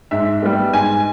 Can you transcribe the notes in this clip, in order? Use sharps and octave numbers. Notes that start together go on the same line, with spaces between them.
G#2 E5
G3 B3
G#2 G#5